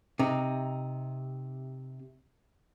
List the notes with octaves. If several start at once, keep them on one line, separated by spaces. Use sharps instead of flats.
C3 D#4